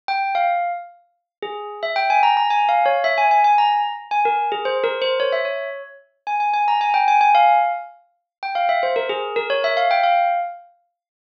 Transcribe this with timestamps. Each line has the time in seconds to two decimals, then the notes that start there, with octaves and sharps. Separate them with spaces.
0.08 G5
0.35 F5
1.42 G#4
1.83 E5
1.96 G5
2.10 G#5
2.23 A#5
2.37 A#5
2.50 G#5
2.69 F5
2.86 C#5
3.04 E5
3.18 G#5
3.31 G#5
3.44 G#5
3.58 A#5
4.11 G#5
4.25 A#4
4.52 G#4
4.65 C5
4.84 A#4
5.02 C5
5.20 C#5
5.33 E5
5.45 C#5
6.27 G#5
6.40 G#5
6.54 G#5
6.68 A#5
6.81 G#5
6.94 G5
7.08 G#5
7.21 G#5
7.35 F5
8.43 G5
8.55 F5
8.69 E5
8.83 C5
8.96 A#4
9.09 G#4
9.36 A#4
9.50 C#5
9.64 E5
9.77 F5
9.91 G5
10.03 F5